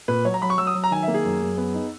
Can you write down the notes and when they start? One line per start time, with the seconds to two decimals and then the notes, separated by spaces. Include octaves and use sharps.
0.08 A#2 B4
0.25 F#3 C#5
0.34 A#5
0.42 F#3 B5
0.50 C#6
0.58 F#3 E6
0.67 D#6
0.75 F#3
0.84 A#5
0.91 D#3 G#5
1.03 E5
1.08 A#3
1.14 G#4
1.25 F#2
1.42 F#2
1.58 B3
1.74 D#4